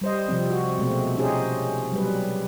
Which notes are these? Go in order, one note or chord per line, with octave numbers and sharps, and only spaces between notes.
G3 C5 D#5
C3 F3 C4
F#4
B2 G#3 A3 C4
C#4 D#4 G4 G#4 C5
F#3 G3 B4